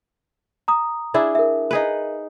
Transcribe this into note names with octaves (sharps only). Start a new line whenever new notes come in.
A#5 D#6
D4 E4 G#4
A#4 E5
D#4 G#4 B4